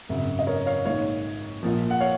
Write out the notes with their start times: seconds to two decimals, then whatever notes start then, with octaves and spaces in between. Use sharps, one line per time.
0.09 G#1 F#2 C#3
0.39 D#5
0.47 A#4 C#5
0.66 C#5 F5
0.85 A#1 G#2 D#3 C#5 F5
1.63 A#1 A#2 F3
1.91 F#5
2.01 C#5 F5